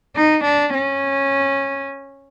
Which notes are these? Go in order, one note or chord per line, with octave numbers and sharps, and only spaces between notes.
D#4
D4
C#4